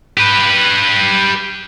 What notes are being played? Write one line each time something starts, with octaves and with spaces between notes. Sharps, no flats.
G4 B4